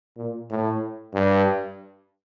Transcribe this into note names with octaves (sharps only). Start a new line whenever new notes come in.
A#2
A2
G2